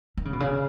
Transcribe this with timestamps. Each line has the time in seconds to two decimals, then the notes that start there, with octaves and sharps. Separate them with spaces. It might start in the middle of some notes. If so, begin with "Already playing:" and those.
0.17 D#3
0.25 C#3
0.33 B2
0.40 C#3